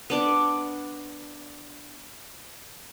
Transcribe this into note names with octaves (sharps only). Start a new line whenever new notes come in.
B3 D4 D5